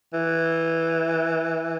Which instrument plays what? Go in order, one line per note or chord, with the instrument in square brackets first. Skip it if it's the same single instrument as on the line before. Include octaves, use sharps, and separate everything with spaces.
[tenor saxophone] E3